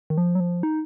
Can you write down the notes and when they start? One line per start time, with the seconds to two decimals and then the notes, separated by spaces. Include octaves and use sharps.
0.10 D#3
0.18 F3
0.35 F#3
0.40 F3
0.63 D#4